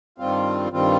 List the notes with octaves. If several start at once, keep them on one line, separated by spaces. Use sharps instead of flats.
G2 D#3 G3 C4 F4
G2 D#3 G3 C4 F4